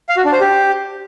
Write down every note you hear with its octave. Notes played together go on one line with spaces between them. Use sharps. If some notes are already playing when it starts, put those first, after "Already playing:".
F5
F#4
D4
C5
G4